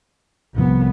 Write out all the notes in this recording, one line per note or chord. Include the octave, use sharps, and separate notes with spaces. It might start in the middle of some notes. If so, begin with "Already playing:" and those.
C2 C3 F3 B3